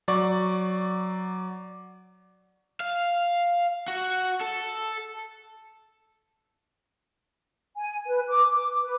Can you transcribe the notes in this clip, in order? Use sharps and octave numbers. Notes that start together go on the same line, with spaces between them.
F#3 D5 C#6
F5
F#4
A4
G#5
B4
D6
B4